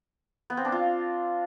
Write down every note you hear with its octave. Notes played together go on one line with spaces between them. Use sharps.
B3
C4
D4
F4